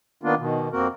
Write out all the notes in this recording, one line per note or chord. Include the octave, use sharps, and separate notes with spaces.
D#3 A#3 B3 D4 F4
B2 D#3
F2 A#3 C4 F#4 A#4